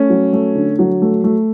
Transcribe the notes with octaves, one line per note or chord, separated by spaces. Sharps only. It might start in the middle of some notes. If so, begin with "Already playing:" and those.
Already playing: A3 C#4
F#3
A3
D3
F#3
A3
A3